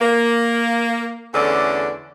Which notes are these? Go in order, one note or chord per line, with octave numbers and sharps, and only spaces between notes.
A#3
E2 D3 A3 C#4 D5